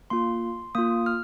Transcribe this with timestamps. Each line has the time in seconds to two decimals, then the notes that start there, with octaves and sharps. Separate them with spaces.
0.10 A#3 F4 C6
0.75 A#3 F4 D#6
1.06 F6